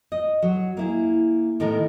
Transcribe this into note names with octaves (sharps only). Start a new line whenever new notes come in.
D#5
F#3
A#3 E4 G#4
A2 D#3 B3 A#4